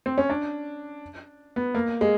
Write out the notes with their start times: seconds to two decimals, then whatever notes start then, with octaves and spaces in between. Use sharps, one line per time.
0.06 C4
0.18 C#4
0.30 D4
1.56 B3
1.75 A#3
2.01 G#3